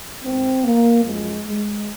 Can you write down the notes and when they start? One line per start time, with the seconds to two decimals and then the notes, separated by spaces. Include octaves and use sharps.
0.23 G#2 D#3 C4
0.64 A#3
1.04 F#2 F3 G#3
1.45 G#3